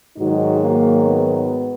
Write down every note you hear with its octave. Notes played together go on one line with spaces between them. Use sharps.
G#2 D#3 F#3 D#4 F#4
A#3
B3